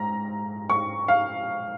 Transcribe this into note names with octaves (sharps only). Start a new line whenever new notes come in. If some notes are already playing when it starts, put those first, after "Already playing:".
Already playing: G#2 A#5
C#6
F5